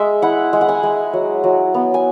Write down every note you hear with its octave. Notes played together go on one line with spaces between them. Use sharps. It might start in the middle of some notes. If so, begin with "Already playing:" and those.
Already playing: G#3 E5
E4 F#5
G#3
F#5
G#5
G#3
F#3
F#3
B3
G#5